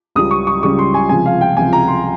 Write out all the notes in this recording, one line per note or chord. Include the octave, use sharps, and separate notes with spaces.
C#2 C#3 G3 D#6
C#6
C#6
C#2 C#3 G3 C#6
C6
G#5
C#2 C3 F3 G#5
F5
G5
C#2 C3 F3 G#5
A#5
C6